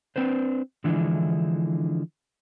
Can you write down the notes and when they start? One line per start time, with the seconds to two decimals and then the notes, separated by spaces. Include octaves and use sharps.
0.16 C4 D4 B4 C5
0.84 D3 E3 F3 G#3 D4 E4